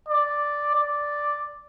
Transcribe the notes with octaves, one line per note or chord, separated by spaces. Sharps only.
D5
D5